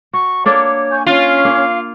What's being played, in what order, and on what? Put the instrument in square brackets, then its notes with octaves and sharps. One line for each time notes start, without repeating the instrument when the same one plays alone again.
[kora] F#4 [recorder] C#6
[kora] A#3 D4 A4 [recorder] C#5
[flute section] G#5 C#6 G6
[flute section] C#4 [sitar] F4 [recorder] F5
[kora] A#3